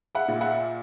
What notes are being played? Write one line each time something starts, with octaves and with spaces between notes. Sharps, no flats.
E5 F#5
A#2
E5 F#5